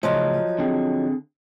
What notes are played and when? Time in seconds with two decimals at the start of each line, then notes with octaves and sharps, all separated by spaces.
0.03 A2 C#3 F3 F#3 D#4
0.59 D3 C4 G#4